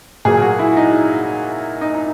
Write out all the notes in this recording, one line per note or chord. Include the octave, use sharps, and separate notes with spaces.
A#2 F#3 A#3 G#4
F#4
E4
D#4
D#4
D#4